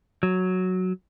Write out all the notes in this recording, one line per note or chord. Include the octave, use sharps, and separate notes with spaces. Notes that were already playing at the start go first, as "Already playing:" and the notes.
F#3